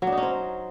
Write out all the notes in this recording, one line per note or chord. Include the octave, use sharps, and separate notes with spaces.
F#3
D4
D#4
C#4
C5